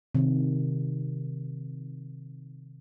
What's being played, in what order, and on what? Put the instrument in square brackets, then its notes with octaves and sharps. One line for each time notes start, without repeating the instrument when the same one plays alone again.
[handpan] C3 D#3